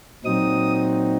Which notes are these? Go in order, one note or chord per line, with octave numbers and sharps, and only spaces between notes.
A#2 F#3 C4 D#4 D#6